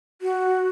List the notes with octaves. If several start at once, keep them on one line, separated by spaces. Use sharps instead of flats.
F#4